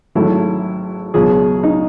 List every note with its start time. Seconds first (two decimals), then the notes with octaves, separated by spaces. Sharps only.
0.15 G#1 G#2 F#3 A3 E4
1.14 C#2 B2 F#3 G#4
1.63 D#4